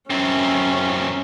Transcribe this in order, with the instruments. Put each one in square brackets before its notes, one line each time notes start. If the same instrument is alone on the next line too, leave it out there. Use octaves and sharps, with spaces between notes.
[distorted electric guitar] F#2 C4 [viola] C#4